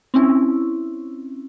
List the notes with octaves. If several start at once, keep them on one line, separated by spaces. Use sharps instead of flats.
C4 C#4 E4